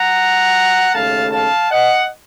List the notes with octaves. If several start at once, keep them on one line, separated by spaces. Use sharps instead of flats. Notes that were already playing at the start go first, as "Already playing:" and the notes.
Already playing: F#5 A#5
D#2 C#3 A3 F5 A5
F5 A5
D#5 F#5